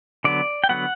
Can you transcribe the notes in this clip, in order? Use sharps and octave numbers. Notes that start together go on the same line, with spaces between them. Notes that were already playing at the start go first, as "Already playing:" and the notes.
D3 F#3 B3 D5
G5
D3 F#3 B3 F#5